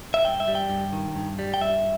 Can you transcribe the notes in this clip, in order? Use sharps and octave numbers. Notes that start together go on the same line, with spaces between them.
E5
G2 G5
E5
G3
G5
G2
D#3
G2
G3
G5
G2 E5